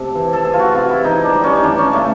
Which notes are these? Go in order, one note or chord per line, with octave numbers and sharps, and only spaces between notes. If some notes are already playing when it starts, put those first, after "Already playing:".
Already playing: C3 A4
E3
A4
E3 G#4
F4
F#4
C3 F4
E4
E3 D#4
D4
G3
C#4
D#4
E3 D4
C#4
C#3 A3